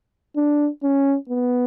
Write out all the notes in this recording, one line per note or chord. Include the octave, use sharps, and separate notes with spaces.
D4
C#4
B3